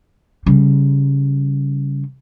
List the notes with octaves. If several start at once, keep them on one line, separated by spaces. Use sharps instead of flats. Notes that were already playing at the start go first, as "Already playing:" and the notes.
C#3 G3